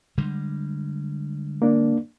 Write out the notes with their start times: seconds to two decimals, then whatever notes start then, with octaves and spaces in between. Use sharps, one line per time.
0.18 D3 G3 G#3
1.62 A#3 D4